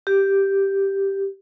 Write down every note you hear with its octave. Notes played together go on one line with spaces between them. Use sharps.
G4